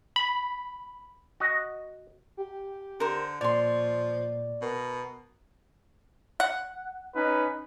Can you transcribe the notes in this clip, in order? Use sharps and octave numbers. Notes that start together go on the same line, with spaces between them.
B5
F#4 D#5
G4
D3 A#4 C5
A#2 F3 C#5 D5 C6
B2 A#4
F#5
C#4 D#4 B4